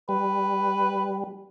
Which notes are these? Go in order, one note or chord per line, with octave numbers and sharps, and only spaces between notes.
G3 B4